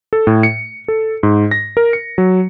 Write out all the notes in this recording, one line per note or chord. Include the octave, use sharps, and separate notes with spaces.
A4
A2
C#7
A4
G#2
A#6
A#4
C#7
F#3